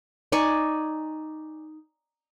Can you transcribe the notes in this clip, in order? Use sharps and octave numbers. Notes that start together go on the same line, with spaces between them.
D#4 D5 G#5 C#6